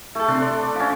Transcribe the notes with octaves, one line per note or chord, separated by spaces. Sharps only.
A3 E4 A4
C3 C4 D4
A4 D5 C6
D6
F3 C#4